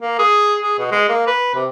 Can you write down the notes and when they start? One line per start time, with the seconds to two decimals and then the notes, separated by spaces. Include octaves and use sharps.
0.02 A#3
0.19 G#4
0.62 G#4
0.79 B2
0.92 G#3
1.09 A#3
1.27 B4
1.55 C3